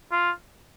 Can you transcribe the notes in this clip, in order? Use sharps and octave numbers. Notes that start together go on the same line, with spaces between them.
F4